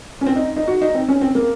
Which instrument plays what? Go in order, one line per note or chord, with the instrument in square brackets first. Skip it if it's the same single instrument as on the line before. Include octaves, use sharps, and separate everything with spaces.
[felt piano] C#4
C4
D#4
D#4
F#4
D#4
C4
C#4
C4
A#3